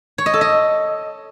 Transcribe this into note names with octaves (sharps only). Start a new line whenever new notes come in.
C#5
D#5
A4
D#5